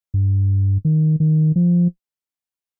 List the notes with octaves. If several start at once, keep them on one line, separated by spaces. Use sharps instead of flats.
G2
D#3
D#3
F3